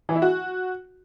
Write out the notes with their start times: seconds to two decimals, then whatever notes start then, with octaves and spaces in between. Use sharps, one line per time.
0.09 E3
0.15 E4
0.22 F#4